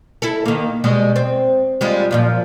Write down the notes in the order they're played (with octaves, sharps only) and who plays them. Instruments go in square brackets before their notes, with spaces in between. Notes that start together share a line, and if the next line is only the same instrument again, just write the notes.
[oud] E4 A4
D#3 A#3
B2 G3 G#3
C4
G3 G#3 F4
F#2 A#2 F3